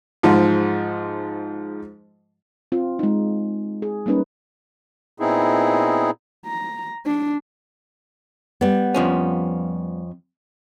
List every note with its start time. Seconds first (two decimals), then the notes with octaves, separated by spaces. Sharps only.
0.23 G#2 F3 G#3
2.72 C4 F4
2.99 G#3 D#4
3.82 G#4
4.06 G3 A#3 C#4 D#4 B4
5.20 A#2 B3 C4 D#4 E4 G#4
6.46 A#5
7.06 D4
8.61 G3 B3
8.94 F2 F3 C#4